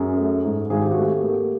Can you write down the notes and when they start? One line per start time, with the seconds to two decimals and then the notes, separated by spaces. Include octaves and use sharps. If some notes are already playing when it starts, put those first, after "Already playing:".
Already playing: F#2 G#4
0.17 A3
0.44 G#2
0.70 G#1 G#4
0.81 G4
0.91 F#4
0.97 A3 G4
1.23 A#3